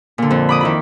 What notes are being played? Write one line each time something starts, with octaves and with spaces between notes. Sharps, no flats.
A#2 D3
F2
B5 D6 D#6
D#3 E4 B5